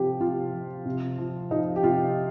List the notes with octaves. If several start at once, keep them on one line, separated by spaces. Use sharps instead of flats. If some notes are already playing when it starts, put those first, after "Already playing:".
Already playing: C3 F3 G4
C3 F4
F3
C3
F3
F3 D#4
G4
C3 F4